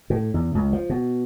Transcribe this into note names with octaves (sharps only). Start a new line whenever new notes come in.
A2
E2
C#2
F3
B2